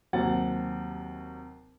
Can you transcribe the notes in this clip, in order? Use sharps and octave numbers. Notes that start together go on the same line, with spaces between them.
D#2 C3 F#3 C4 F#5 A6